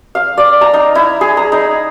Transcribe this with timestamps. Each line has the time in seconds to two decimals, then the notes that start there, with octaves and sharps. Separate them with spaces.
0.15 F5
0.38 D5
0.61 A#5
0.74 D#4
0.95 E4
1.21 G#4
1.37 A#5
1.52 D#4